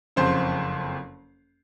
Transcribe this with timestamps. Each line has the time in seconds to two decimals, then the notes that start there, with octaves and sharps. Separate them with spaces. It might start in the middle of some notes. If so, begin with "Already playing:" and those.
0.16 F#1 F2 C#3 C5